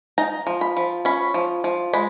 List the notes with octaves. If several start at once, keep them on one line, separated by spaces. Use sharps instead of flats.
D#4 A#5
F3
B5
F3
C#4 B5
F3
F3
G#3 B5